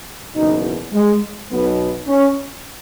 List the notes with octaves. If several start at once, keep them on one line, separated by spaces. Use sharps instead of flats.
F#1 E2 B2 D#4
G#3
B1 B2 B3
C#4